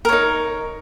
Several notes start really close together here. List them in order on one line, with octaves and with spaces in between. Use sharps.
A#4 C#5 D#4